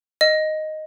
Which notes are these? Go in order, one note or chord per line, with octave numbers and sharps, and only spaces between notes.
D#5